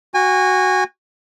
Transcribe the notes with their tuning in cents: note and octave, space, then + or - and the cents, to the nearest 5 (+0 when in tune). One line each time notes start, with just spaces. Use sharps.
F#4 +0 G#5 -30